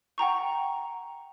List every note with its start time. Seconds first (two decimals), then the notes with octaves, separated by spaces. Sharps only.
0.18 F#5 G5 A#5 C#6